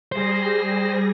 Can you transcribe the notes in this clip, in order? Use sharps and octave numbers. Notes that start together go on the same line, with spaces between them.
G3 G#4 C5 A#6